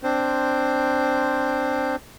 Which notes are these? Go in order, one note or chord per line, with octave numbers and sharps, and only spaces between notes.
C4 D4 C5